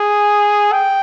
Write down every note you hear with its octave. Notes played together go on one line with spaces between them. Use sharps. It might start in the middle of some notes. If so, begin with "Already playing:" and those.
Already playing: G#4
G5